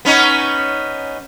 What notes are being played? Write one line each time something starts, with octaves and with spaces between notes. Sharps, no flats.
B3 C#4 D#4